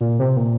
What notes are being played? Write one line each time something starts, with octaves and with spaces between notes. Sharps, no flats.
A#2
C3
A#2